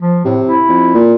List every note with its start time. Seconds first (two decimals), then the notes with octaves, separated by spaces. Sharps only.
0.01 F3
0.25 A2 C3
0.45 E4
0.69 F2
0.94 A#2